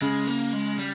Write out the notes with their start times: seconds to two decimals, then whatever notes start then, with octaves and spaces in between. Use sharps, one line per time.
0.01 C#3 G#3
0.27 A#3
0.53 G#3
0.78 G3